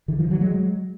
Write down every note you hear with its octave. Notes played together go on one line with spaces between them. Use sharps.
D3 E3
D#3 F3
E3 F#3
F#3 G#3